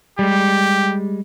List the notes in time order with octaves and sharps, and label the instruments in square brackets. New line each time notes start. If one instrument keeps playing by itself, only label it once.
[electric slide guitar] G3 G#3 [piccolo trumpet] G4